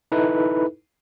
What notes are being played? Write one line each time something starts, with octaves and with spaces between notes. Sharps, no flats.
D#4 E4 A4 B4